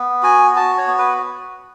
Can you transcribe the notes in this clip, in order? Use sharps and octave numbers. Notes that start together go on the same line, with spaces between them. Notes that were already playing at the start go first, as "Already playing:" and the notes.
Already playing: B3
F#4 G#5
F#4 A5
C#5
B3
B4